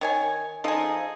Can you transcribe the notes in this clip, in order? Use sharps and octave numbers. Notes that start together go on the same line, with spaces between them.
D#3 C#5 G#5
F3 D#4 G#4 A4 D#5